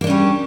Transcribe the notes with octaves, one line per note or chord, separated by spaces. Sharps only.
G3 A#3 C#4 D4